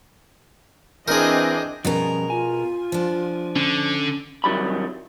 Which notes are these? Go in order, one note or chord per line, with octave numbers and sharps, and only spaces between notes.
E3 C4 D4 G#4 A#4 D#5 G6
B2 F3 G3 C#4 G#4 A#4
F4 G#5
F3 D4
D3 C#4
C2 D#3 F#3 G3 B5